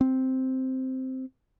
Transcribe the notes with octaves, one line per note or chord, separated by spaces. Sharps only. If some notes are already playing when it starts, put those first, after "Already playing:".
C4